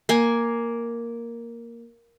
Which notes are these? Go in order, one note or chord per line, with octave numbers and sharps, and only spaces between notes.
A#3 G#5